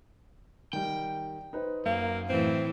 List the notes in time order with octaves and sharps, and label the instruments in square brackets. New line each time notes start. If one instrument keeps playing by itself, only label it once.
[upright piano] D#3 G3 [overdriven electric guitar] G5
[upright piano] D#4 B4 C5
[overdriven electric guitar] F#2 [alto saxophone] A#3
[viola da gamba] A2 E3 [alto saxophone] C4